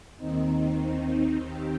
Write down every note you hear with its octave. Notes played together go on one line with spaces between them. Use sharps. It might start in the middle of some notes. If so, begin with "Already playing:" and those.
D#2 D#3 C4 D#4
D#2 D#3 C4 G4